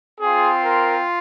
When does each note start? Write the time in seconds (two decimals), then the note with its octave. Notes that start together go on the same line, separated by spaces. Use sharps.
0.20 C4 F4 G#4
0.64 A#4